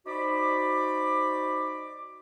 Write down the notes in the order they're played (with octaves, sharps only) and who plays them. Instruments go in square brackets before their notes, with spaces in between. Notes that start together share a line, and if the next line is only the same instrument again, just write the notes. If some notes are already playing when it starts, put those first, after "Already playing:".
[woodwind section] D#4 F#4 C5 D5 B5 D6